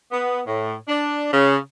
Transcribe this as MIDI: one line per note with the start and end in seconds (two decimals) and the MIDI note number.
0.12 0.40 59
0.47 0.74 45
0.88 1.31 62
1.32 1.56 49